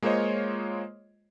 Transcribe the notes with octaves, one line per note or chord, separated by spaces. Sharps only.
G#3 A#3 F4 C5 C#5 D#5